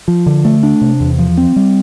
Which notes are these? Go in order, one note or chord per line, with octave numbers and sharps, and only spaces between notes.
F3
D3
A3
D4
C3
E2
F3
C4
G3